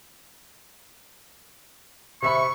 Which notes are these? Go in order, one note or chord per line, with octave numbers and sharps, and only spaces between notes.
C3 E5 B5 C#6